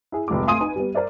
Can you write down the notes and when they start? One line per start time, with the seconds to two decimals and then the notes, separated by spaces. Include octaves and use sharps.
0.12 E4 G#4
0.28 F1 C2 G#3 D6
0.47 A3 F5 G#5 C6 D#6 D#7
0.60 D#4 B4 G#5
0.76 G3 B3
0.95 A#4 C5 D5 E5